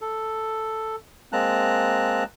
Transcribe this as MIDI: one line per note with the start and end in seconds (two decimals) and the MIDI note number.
0.01 0.96 69
1.32 2.24 56
1.32 2.24 58
1.32 2.24 60
1.32 2.24 81
1.32 2.24 82
1.32 2.24 90